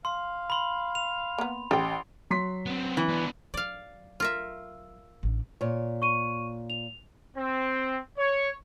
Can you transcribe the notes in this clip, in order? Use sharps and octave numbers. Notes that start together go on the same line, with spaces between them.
F5 C6
B5 C6
F7
A#3 B3
A1 G4 G5 C6
F#3 C6 B6
B3 C4
E3
B3 D4
F#3 D5 F5
F4 A#4 E5
A1 D4
A#2 C#5
C#6 D#7
F7
C4
C#5